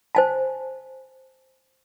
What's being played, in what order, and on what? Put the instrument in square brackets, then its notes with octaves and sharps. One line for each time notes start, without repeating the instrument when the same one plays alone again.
[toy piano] C5 G#5 A5